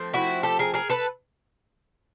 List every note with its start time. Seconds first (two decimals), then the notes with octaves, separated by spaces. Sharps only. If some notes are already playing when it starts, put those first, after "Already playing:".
Already playing: F3 A3 C4
0.14 E4 F#4
0.43 G4 A4
0.59 G#4 A#4
0.74 G#4 A#4
0.90 A4 B4